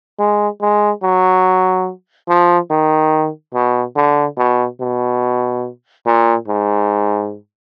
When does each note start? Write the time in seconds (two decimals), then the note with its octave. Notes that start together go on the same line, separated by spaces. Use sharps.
0.19 G#3
0.61 G#3
1.03 F#3
2.29 F3
2.71 D#3
3.54 B2
3.96 D3
4.38 B2
4.80 B2
6.06 A#2
6.48 G#2